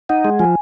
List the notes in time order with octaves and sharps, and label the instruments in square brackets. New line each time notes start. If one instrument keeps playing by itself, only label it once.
[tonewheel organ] D#4 [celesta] F#5
[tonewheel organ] G#3
[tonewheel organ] F3 [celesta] G#5